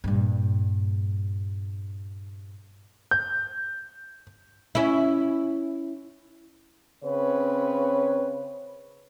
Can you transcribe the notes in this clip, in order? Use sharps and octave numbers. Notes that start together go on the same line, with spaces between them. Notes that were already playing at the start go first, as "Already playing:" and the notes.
G2 A#2
G6
C#4 E4
C#3 C4 B4 C#5